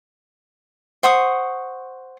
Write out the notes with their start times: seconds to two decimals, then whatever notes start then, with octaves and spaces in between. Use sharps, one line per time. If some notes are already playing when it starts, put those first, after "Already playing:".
1.03 C5 F#5 C#6 D#6